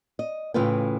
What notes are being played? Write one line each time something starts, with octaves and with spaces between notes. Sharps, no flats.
D#5
A2 C#3 E3 F4 B4 G5